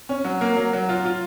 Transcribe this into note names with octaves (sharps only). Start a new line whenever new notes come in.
C#4
F#3
A#3
F#3
F#3
F4
F4